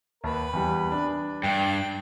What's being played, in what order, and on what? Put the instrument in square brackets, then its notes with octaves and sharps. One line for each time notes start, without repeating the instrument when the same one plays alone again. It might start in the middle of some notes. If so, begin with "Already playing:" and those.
[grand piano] D#2 A5 [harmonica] B4
[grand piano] E2 E3 G3
D4
[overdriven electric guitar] G2 [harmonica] G5